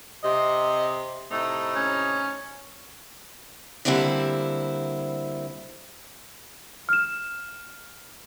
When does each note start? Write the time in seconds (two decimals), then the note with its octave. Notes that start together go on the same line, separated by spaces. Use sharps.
0.24 C3 D#5
1.32 A2 C3 A3 D#4
1.76 C#4
3.85 D3 G3 A#3 C4 E4
6.89 F6 E7